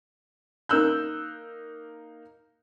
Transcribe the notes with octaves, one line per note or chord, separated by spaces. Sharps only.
A#3 D#4 E6 F#6 G6